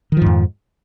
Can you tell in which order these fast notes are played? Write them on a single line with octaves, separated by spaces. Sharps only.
D#3 F3 G#2 F2